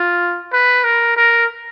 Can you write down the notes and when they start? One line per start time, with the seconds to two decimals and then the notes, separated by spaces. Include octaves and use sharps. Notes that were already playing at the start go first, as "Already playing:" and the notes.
Already playing: F4
0.53 B4
0.84 A#4
1.17 A#4